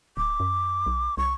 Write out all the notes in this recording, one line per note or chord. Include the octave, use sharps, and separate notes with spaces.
D1 D6
F#2
B1
C2 C#6